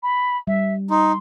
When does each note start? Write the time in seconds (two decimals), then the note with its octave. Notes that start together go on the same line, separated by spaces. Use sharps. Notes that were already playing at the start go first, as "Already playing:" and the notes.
0.03 B5
0.47 G3 E5
0.91 D#4 C6